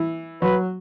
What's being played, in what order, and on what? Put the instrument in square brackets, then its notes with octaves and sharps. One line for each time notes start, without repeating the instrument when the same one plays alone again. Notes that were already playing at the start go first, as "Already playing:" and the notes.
Already playing: [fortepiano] E3
[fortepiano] F#3 [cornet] B4